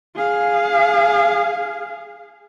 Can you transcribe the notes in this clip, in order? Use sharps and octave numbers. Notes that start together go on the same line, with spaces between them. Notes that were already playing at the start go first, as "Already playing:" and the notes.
G#4 F5